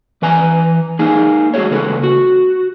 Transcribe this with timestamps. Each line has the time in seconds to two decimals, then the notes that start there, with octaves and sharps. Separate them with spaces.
0.22 E3 B4 G#5 A#5
0.99 A#3 D#4 G#4 A#4 F5 G#5
1.54 G#3 F#4 G#4 B4 C#5
1.71 C#3 A#3 A4 B4
2.04 F#4